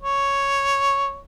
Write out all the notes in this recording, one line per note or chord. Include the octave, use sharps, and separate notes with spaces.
C#5